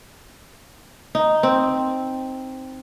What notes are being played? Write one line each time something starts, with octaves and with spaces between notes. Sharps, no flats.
D#4
C4